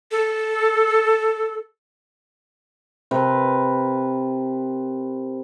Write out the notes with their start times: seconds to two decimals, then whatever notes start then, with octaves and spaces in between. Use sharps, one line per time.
0.11 A4
3.11 C3 A#4 B4